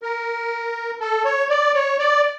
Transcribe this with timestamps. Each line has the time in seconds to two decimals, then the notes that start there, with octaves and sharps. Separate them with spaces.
0.02 A#4
1.01 A4
1.25 C#5
1.50 D5
1.74 C#5
1.99 D5